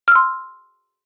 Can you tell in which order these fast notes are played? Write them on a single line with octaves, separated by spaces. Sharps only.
F6 E6 C6